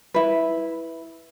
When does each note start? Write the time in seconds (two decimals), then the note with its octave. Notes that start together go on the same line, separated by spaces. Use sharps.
0.14 E4 B4